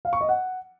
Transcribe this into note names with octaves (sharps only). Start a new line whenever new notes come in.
F5
C#6
D#5
F#5